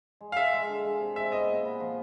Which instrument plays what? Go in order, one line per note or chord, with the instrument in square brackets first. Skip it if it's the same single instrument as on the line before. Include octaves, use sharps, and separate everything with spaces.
[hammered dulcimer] G#3
[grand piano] F5
[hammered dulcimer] G#3 [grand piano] E5
[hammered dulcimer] G#3
D3
G#3
C3
[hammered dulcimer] G#3 [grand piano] E5
[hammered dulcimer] B3 [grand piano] D#5
[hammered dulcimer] A#2
B3
F3